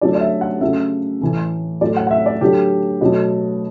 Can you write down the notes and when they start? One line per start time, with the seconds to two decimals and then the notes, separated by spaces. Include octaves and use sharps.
0.01 D3 F#3 A3 D5
0.15 D5
0.21 E5
0.41 F#5
0.61 C#3 F#3 A3 E5
1.21 A2 E3 A3
1.81 A2 F#3 A3 D5
1.96 F#5
2.07 F#5
2.11 E5
2.26 D5
2.41 D3 F#3 A3 G4
3.01 B2 F#3 A3